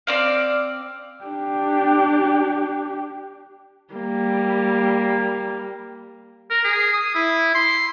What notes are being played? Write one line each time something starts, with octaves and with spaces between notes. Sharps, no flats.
C4 D5 F5
D4 G4
G3 A#3
A#4
G#4
D#6
E4
C6